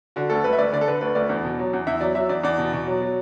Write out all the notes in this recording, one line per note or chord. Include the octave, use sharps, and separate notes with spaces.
D3 F#4
D2 A4
D2 B4
E5
D2 D5
D3 D5
A4
D3 B4
D2 B4
D2 D5
E2
B2
F#3
E2
E2 E5
F#3 D5
F#3 E5
E2 D5
E2 D5
B2
B2
F#3
F#3